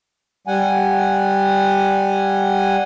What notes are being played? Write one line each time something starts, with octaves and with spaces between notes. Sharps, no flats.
G3 F#5 G#5